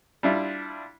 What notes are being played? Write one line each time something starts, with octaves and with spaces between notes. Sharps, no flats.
G3 D4 E4 F4